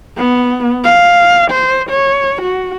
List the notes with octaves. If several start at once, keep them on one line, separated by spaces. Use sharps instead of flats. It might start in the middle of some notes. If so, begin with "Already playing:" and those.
B3
F5
C5
C#5
F#4